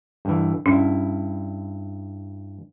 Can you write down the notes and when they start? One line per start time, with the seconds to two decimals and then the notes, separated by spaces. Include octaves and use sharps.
0.25 G2 E3
0.66 G2 C#4 E4